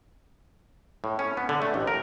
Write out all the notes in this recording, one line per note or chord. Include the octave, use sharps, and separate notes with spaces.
A2
C#4
B3
D3
A3
A1
A#4